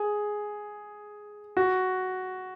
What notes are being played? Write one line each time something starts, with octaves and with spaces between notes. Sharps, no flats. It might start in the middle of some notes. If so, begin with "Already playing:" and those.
Already playing: G#4
F#4